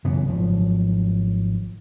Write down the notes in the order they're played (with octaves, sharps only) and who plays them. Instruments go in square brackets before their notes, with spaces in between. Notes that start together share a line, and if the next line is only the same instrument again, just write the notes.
[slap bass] F#2 C#3 E3 B3
G#1 F3 F#3